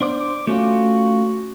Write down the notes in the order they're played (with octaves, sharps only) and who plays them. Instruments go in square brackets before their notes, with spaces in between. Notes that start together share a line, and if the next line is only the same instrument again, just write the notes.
[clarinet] B3 [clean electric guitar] D4 C5 D5
[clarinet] D6
[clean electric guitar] A3 C#4 F4 [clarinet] F#4